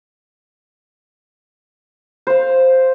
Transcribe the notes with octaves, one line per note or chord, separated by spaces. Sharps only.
C5 F5